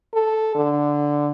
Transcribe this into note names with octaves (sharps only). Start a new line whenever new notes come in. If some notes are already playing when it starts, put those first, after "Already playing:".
A4
D3